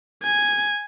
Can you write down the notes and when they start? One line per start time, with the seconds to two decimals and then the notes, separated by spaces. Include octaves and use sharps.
0.24 G#5